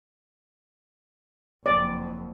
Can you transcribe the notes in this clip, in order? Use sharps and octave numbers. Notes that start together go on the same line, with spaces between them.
F#1 F2 D5